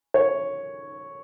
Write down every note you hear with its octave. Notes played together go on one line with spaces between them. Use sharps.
C#5